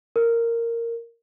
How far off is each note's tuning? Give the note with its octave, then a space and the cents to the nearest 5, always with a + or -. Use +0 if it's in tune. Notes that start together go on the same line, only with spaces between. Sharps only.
A#4 -10